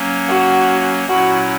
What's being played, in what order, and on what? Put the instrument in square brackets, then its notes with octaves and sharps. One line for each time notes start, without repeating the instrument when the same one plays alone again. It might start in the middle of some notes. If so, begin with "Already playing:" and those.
Already playing: [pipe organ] F#3 A#3 C#4
[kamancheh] F#4
[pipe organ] A#2 F#3 C#4 E4 [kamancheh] F#4